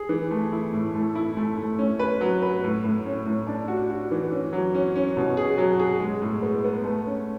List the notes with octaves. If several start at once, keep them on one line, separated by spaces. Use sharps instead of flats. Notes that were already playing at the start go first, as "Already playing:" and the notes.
Already playing: G#4
E3
A3
E4
A2
A3
E4
A3
A3
C#4
B4
F#3
B4
A2
A2
C#4
A2
D4
F#4
F#4
E3
C#4
F#3
C#4
C#4
B2
G#4
F#3
G#4
G#3
A2
B3
B3
A3
C#4